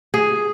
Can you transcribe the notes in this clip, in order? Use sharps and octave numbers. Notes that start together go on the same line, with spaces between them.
G#4